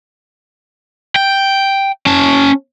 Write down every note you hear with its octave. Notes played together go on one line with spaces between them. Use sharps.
G5
C#4 A5